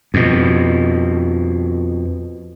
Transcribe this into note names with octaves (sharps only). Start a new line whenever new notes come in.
F2 B2